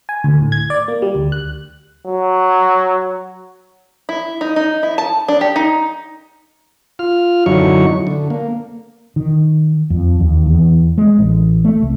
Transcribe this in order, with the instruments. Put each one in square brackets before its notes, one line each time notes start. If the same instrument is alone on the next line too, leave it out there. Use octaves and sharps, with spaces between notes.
[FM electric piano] G#5
D2
A2
G#6
D5
A#3
G3
D2
F#6
[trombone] F#3
[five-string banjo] E4
D#4
D#4
E4
A5
D4
G4
D#4
[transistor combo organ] F4 F6
F#2 D3 F#3 D#4 E4 C#6
D3
A#3
[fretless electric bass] D#3
F2
D#2
E2
G#3
A1
A3
C2